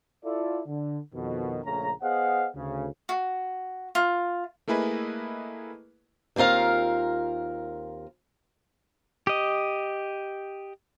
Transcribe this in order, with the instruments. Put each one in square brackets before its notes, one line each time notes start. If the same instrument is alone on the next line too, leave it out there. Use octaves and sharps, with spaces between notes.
[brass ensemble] E4 F4 A4 D5
D3
F2 B2 D#3
A#1 C#3 A3 C#4 A#5
B3 G#4 C5 D#5 F5 F#5
D2 C#3
[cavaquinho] F#4
F4
[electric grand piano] A3 A#3 E4 G#4 B4 D#5
[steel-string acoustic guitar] D#2 C4 F4 A#4 F5
[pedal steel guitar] G4 D#5